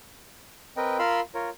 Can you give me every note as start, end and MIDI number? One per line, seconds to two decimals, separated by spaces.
0.77 0.98 60
0.77 0.98 70
0.77 0.98 71
0.77 0.98 75
0.77 0.98 79
0.99 1.20 65
0.99 1.20 70
0.99 1.20 77
0.99 1.20 83
0.99 1.20 84
0.99 1.20 88
1.34 1.50 65
1.34 1.50 70
1.34 1.50 73